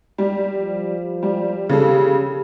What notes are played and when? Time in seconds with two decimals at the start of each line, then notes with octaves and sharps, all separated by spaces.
0.18 G3
0.54 F3
1.23 G3
1.69 C#3 G4 A4